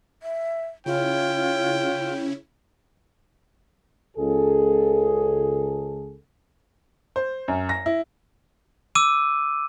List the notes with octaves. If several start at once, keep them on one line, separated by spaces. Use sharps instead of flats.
E5
C#3 C#4 E4 F4 C#5 G5
C#2 G#4 A4
C5
F#2
A#6
E4
D6 E6 D#7